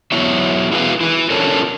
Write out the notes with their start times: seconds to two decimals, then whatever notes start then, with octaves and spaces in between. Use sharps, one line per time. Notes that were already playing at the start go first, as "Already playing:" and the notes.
0.12 F#3 B3 E4 C#5 E5
0.72 E4 F#4 G#4 A4 B4 F5
1.01 E4 B4
1.30 C#4 D4 F4 A4 A#4 C#5